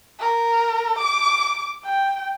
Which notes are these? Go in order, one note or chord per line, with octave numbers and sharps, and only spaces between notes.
A#4
D6
G5